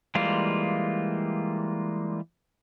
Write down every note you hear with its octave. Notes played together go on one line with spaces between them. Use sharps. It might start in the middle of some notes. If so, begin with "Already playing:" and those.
E3 G3 G#3 A#3 F4